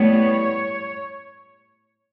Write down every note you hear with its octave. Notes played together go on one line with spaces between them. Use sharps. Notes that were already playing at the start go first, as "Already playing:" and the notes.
Already playing: A2 G3 B3 C#5